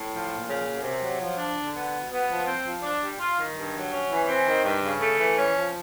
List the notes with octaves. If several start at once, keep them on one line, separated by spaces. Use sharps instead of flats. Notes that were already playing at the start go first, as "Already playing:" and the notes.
Already playing: A2
F3
A#2
C#3
F#2
C3
F#3
F3
D4
D3
B3
B2
B3
F3
C4
F3
D4
G3
F4
D#3
G2
F#3
C#4
E3
C4
D#3
G2
C#3
A3
E3
C#4
F3